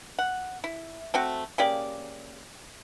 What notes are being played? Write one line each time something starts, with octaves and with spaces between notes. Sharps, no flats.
F#5
E4
A3 C4 F#4
C#3 A#3 G4 D5